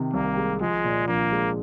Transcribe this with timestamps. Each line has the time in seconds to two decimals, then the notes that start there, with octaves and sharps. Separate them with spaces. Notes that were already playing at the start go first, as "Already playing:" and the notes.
Already playing: C3 D#3
0.14 C2 A#3
0.37 G#3
0.61 F3 G#3
0.84 A#2
1.08 A#1 A#3
1.32 G#3